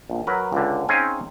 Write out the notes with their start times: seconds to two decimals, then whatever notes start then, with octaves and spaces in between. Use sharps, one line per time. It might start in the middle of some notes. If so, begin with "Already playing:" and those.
0.10 A#1
0.27 F#3 A#4 B4
0.53 C#2 D3
0.89 C4 C#4 D#4 G#4 F5 G#5